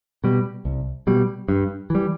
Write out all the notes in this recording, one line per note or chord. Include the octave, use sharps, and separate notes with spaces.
B2 G3
C2
B2 G3
G2
E3 G3